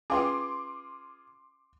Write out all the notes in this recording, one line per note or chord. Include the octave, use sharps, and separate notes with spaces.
C#4 F4 G#4 B4 G5 C6 D6